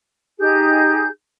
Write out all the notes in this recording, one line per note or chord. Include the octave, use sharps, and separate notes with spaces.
D#4 G4 G#4 G6